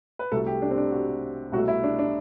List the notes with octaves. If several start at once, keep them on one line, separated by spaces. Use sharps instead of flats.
B4
C2 C3 F#3 A3 A4
G4
D4
C4
D4
F#4
C2 B2 F#3 A3 F#4
E4
D4
D4